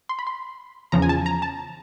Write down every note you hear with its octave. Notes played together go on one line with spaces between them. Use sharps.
C6
B5
C6
E2 C#3 F3 A#5
G#5
A5
A#5
A5